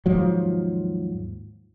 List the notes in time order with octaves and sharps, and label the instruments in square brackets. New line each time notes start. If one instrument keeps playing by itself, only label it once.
[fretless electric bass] D#2 G#2 F3 F#3